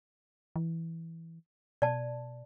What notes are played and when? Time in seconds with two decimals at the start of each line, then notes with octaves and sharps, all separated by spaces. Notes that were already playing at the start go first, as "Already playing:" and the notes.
0.56 E3
1.82 B2 D5 A5